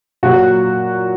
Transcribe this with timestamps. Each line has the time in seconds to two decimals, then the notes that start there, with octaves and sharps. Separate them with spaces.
0.23 A#2 F#3 F#4